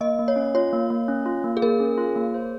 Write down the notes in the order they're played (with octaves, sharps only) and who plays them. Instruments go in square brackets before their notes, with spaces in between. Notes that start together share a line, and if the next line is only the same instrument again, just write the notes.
[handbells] A#3 [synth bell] D#5
[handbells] A#3
[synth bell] C#5
[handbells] C#4
[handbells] F4 [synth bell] C#5
[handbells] A#3
A#3
C#4
F4
A#3
[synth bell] G#4
[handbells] A#3 [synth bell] A#4
[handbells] C#4
F4
A#3
C5